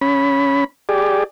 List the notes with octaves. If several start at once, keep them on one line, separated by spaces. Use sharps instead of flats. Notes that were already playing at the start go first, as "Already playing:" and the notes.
C#4 B5
G4 G#4 D5